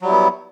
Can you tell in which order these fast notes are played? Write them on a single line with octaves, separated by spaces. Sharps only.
F#3 G3 E4 B3